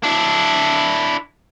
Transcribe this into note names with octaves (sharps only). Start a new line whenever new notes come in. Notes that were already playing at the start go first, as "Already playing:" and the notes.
D4 E4